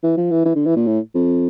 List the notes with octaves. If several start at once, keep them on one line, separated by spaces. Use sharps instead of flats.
E3
F3
E3
E3
D3
E3
A#2
A2
F2